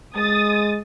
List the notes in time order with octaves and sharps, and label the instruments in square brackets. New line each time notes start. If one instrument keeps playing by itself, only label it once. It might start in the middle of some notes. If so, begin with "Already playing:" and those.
[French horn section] G#3 [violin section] D#6 A6